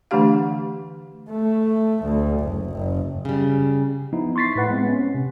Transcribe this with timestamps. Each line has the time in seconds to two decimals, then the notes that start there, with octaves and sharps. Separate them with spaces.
0.11 D3 E3 A3 D4 G4 F5
1.31 A3
2.03 D2
2.40 F#1
2.69 F#1
3.25 C#3 G3
4.13 F3 B3 D#4 E4
4.36 C6 C#6 A6 B6 C7
4.55 A2 E4 B4 F#5
4.71 G#3 B3 C4
4.87 C#4
5.14 C3